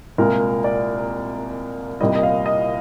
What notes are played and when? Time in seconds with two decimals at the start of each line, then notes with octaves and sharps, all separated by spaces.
0.18 C2 A#2 G#3 A#4
0.64 D5
2.01 C2 A#2 G3 D#5
2.16 D#5
2.23 F5
2.46 D#5